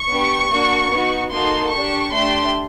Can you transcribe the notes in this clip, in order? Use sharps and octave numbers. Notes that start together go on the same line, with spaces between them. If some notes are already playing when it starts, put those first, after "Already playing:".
Already playing: C#6
B3 D4 G4
A#3 D4 F#4
B3 D#4 F#4
A#3 D#4 F#4 A4 C6
D4 G4 C#6
A3 D4 G4 C6